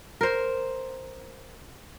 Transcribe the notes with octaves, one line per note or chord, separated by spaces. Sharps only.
A#4 C5